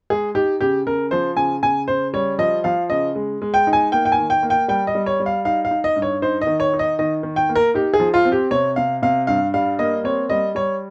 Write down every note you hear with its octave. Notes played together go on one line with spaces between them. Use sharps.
G#3 G#4
D#4 G4
C#3 G4
C#3 A#4
F3 C5
C#3 G#5
C#3 G#5
C#3 C5
G3 C#5
F3 D#5
F3 F5
C#3 D#5
G#3
G#3
G5
D#4
G#5
A#3 G5
G5
G#5
D#3
G5
A#3
G5
G3 G5
D#5
G3
C#5
G3
F5
D#4 F5
F5
D#4
D#5
G2
C#5
D#4 C5
D#5
D#3
C#5
D#4
D#5
D#3 D#5
D#3
G5
A#3
A#4
D#4 G4
G#4
F3
F4
C4
G4
C3 C#5
C3 F5
C3 F5
G2 F5
G3 F5
A#3 D#5
C4 C#5
G3 D#5
G3 C#5